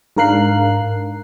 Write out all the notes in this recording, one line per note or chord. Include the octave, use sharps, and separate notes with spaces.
G#2 D4 A#4 F5 F#6 C7